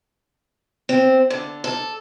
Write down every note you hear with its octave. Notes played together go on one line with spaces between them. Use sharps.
C4
D3
A4